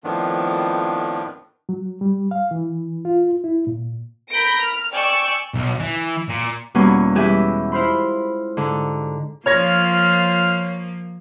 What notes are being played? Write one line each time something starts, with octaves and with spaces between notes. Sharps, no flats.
F2 A2 D#3 F3 B3 D4
F#3
G3
F5
E3
F4
E4
A#2
A#4 B5 G6 A#6 D7
F6
D5 G5 G#5 C#6 E6
B1
E3
A#2
E2 B2 G3 A#3 B3 C#4
E3 G#3 G4 G#4 B4 E5
E4 F4 C5 B5 C6
G#2 D3
F3 A#3 F4 C#5 F6 G#6 A#6